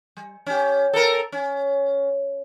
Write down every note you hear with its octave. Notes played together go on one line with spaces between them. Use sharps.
G3
C#4 G4
A4 A#4
C#4